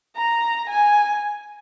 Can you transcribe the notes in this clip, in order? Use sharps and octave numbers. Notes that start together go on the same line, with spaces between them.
A#5
G#5